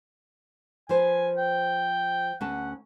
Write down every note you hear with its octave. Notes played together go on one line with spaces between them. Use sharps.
F3 B4 C5 G#5
G5
D2 C#4 F#5 A5